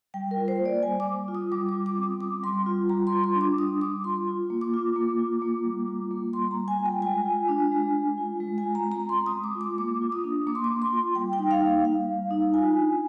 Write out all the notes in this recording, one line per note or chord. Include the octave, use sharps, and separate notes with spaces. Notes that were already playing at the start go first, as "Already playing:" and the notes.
G3 G5
A#4
F4
C5
A#3
D5
G3 G#5
D6
G3
F4
D#6
G3 D6
D6
F4
D6
C4
D#6
G3 D6
G3 C6
F4
G3 A#5
C6
F4
C6
D4
D6
G3 D#6
G3 D6
F4 C6
F4
A#3
D6
F4
A#3
F4
A#3
G3
F4
A#3
G3 C6
A#5
G3
G#5
F4
G5
G#3 G#5
F4
D4
G#3
G#3
F4
G#3
G#5
F4
A#5
C4
A#5
G#3 C6
D#6
G#3
D6
F4
D6
A#3 D6
F4
D#6
D4
A#3 D6
C6
D6
A#3
C6
F4
G3 G5
G5
D#4
F5
A#3
G3 F5
G3
D#4
F4 G#5
D4